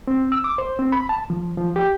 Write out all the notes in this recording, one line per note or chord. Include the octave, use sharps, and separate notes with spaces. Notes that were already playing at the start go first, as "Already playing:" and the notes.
C4
E6
D6
C5
C4
B5
A5
F3
F3
G4